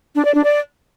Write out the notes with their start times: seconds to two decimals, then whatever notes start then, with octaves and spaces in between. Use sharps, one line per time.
0.15 D4
0.25 D5
0.34 D4
0.44 D5